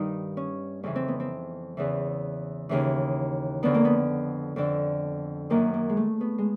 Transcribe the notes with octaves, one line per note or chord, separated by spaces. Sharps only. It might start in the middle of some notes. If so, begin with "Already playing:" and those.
Already playing: G2 D#3 D#4
C#4
F2 C#3 E3 C#4
C4
B3
C4
E2 C#3 E3
D#2 C#3 E3
F2 D3 B3
A#3
B3
F2 D3
F#2 D#3 A#3
A#3
G#3
A3
B3
G#3